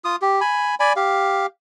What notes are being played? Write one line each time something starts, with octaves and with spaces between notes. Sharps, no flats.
F4 D#6
G4
G#5 B5
D5 G#5 B5
G4 F5